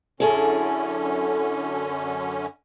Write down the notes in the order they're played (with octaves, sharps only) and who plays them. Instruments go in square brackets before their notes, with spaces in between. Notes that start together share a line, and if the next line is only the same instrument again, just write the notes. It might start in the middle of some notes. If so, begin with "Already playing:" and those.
[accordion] F#2 D3 C#4 [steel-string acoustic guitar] E4 G#4 A4